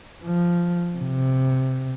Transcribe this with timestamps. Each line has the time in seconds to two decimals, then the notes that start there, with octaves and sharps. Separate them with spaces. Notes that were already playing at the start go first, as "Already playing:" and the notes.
0.24 F3
0.98 C3